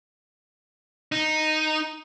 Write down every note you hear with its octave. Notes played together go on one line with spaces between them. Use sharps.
D#4